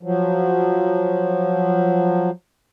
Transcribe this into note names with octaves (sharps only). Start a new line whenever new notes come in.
F3 F#3